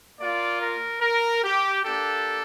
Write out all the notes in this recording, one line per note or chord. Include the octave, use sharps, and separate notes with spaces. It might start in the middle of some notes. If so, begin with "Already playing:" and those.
A#3 F4 D5
A#4
A#4
G4
A#3 D4 G4 A4